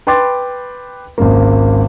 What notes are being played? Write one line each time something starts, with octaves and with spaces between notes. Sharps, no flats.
B4 G5 B5 C6 D6 A6
G#1 C#2 A#3